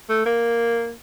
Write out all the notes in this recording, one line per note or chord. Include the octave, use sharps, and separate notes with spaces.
A3
A#3